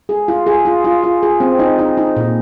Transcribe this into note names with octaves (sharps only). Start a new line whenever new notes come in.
G#4
F4
G#4
F4
F4
F4
G#4
C4
D#4
D#4
D#4
A#2